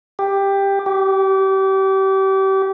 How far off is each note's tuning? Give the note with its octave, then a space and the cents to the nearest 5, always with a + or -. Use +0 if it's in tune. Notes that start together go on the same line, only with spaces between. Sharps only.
G4 +10
G4 -30